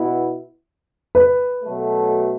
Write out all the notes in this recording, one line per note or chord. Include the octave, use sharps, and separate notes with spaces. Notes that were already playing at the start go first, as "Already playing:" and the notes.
Already playing: B2 B3 E4
B4
B2 F#3 A3